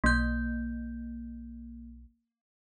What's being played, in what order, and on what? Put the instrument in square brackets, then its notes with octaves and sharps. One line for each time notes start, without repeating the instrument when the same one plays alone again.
[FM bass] B1 [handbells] A#3 G6